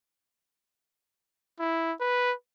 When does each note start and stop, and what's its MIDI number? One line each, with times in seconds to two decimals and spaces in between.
1.60 1.93 64
2.00 2.33 71